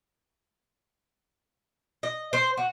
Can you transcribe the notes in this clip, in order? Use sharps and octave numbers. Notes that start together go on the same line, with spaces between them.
D#5
C5
F#4